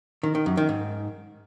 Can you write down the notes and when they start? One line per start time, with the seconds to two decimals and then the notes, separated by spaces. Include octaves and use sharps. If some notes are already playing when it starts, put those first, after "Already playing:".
0.23 D#3
0.35 D#3
0.46 F#2
0.57 D#3
0.69 G#2